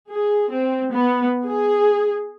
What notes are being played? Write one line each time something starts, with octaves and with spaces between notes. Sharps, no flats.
G#4
C4
B3
G#4